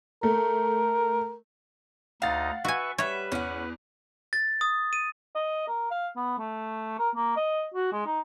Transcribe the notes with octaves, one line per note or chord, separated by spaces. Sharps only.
A3 A#4
D2 D#4 F5 F#5 A#5 A6
F#4 B4 E5 G#5 C#6
G3 B4 C#5 E5
E2 C#4 F#5
A6
D#6
D#7
D#5
A#4
F5
B3
A3
A#4
A#3
D#5
F#4
G#3
D#4